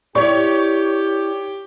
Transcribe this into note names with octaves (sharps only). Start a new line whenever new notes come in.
E4 G4 C#5 D5 C#6